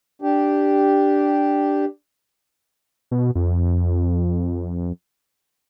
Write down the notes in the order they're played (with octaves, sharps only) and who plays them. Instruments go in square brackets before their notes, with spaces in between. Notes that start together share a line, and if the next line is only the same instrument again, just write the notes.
[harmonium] D4 G4
[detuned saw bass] B2
F2